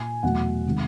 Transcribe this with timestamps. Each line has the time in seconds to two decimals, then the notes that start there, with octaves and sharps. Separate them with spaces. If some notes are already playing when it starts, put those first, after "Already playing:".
Already playing: A#2 G#5
0.23 E2 B2 F#3 A3 F#5
0.66 C3 D#3 G#3